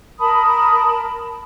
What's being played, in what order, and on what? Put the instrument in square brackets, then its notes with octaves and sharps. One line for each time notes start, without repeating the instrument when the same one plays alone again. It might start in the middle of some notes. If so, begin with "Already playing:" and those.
[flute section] A#4 A5 B5 D#6